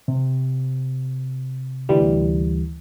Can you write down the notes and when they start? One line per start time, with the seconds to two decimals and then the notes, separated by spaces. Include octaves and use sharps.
0.08 C3
1.89 D2 E3 G3